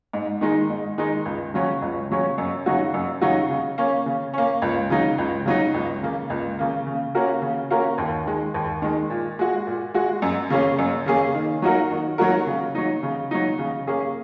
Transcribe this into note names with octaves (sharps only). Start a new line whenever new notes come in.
G#2
D#3 G#3 D#4
G#2
D#3 G#3 D#4
C#2
C#3 F#3 C#4
C#2
C#3 F#3 C#4
F#2
C#3 F#3 D#4 F#4
F#2
C#3 F#3 D#4 F#4
C#3
A#3 C#4
C#3
A#3 C#4
C#2
C#3 F#3 D#4
C#2
C#3 F#3 D#4
C#2
C#3 A#3
C#2
C#3 A#3
C#3
A#3 C#4 F#4 A#4
C#3
A#3 C#4 F#4 A#4
D#2
D#3 G#3
D#2
D#3 G#3
A#2
G#3 F#4
A#2
G#3 F#4
F#2
C#3 A#3 C#4 G#4
F#2
C#3 A#3 C#4 G#4
D#3
F#3 D#4 F#4 A#4
D#3
F#3 D#4 F#4 A#4
C#3
F#3 D#4
C#3
F#3 D#4
C#3
A#3 C#4 G#4